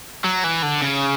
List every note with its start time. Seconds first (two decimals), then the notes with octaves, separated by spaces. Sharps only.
0.24 F#3
0.44 E3
0.62 D3
0.82 C#3